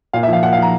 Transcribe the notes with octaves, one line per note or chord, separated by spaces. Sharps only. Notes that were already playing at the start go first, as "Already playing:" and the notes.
A#2 F5
E5
F3 F5
A#2 F#5
F5
F3 A#5